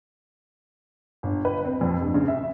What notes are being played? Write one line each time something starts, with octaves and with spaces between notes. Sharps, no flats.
G1
B4
C4
F2
G2
C#3
E5